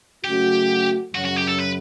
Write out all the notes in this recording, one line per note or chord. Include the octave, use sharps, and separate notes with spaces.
C#3 F#3 A3 C#4 F#4 G4
F#2 C#3 F#3 F#4
F#4
G4
A4
B4